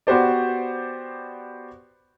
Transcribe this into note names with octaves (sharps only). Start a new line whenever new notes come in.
B3 F#4 G4 C5 D5